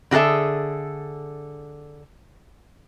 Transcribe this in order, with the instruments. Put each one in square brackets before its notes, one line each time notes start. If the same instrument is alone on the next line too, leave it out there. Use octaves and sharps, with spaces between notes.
[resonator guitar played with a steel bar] D3 F#4 G#4 A4 E5